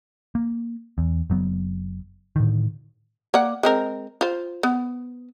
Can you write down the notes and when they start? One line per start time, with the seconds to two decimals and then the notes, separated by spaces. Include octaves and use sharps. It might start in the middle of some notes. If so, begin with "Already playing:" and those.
0.35 A#3
0.98 E2
1.30 F#1 F#3 B3
2.36 A2 D3 D#3
3.34 A#3 D5 F#5
3.63 G#3 C4 A#4
4.21 F4 C5
4.63 B3